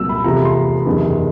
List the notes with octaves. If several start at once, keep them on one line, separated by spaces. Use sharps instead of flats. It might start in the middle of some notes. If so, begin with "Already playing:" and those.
Already playing: C2 A#2 F#3 E6
B5
F1 E2 C3 F3 A#5
B5
C6
F#1 E2 C3 D#3